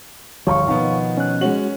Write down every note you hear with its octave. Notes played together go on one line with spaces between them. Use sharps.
D1 G1 F3 C#5 F5 C#6
B2 D#3 F3 B3
C#4 F#6
G#3 C#4 F#4 F#7